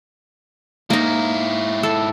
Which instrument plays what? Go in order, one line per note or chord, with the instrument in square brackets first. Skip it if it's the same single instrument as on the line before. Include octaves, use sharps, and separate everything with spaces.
[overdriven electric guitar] G#2 E4 [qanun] A#3 D#4
[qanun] A4